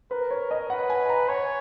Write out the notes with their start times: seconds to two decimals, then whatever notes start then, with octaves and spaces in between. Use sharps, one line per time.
0.11 A#4 B4
0.31 C#5
0.51 D#5
0.70 B4 F#5
0.90 G#5
1.10 A#5
1.29 C#5 G#5